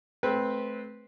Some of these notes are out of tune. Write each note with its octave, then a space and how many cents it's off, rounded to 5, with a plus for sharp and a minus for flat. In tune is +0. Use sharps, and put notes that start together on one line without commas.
A3 -30 C4 +0 B4 -15